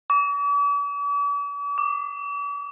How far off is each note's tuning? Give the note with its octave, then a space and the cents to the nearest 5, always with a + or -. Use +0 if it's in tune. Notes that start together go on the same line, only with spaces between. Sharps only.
D6 -45
D6 +20